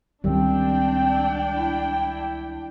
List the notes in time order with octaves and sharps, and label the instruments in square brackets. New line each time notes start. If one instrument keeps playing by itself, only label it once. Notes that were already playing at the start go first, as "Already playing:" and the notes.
[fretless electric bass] C#2 [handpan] D#3 G3 [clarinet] C4 [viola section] D4 G5
[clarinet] E4